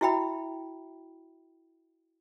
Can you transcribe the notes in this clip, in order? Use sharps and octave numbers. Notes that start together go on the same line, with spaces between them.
E4 F#4 E5 G5 B5